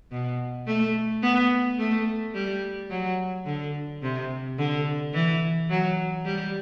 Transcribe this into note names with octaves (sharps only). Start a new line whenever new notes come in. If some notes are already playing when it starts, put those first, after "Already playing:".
B2
A3
B3
A3
G3
F#3
D3
C3
D3
E3
F#3
G3